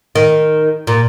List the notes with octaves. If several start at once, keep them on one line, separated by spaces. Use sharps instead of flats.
D#3
A#2